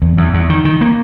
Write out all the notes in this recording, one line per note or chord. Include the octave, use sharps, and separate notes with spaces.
E2
E2
E2
D#3
D#3
A#3